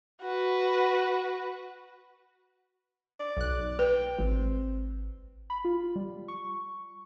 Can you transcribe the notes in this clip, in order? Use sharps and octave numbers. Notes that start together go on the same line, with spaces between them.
F#4 B4
D5
B1 F#6
B4 G5
G#1 C4
B5
F4
G3
C#6